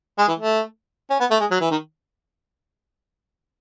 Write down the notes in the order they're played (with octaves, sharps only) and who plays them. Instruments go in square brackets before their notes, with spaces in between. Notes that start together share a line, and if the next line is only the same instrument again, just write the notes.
[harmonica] G#3
E3
A3
C#4
B3
A3
G#3
F#3
E3
D#3